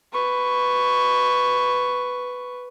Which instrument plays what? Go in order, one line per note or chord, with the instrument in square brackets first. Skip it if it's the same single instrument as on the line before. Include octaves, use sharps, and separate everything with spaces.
[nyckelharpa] B4 C#6